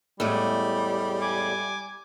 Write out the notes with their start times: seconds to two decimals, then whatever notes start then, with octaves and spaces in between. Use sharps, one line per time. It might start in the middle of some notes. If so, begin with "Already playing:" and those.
0.20 E2 A2 G3 G#3
1.21 G#5 D6